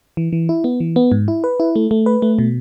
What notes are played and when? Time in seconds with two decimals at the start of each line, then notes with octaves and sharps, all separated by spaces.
0.17 E3
0.33 E3
0.49 E4
0.64 B3
0.80 E3
0.96 B3
1.12 G#2
1.28 E4
1.44 B4
1.60 E4
1.76 A3
1.91 A3
2.06 B4
2.22 A3
2.39 B2